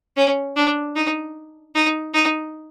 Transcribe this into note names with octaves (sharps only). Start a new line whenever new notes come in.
C#4
D4
D#4
D#4
D#4